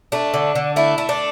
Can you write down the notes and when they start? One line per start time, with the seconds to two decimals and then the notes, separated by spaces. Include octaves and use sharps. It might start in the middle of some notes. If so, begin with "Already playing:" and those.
0.12 A3 D4
0.34 D3
0.55 D3
0.76 A3 E4
0.98 A3
1.09 D4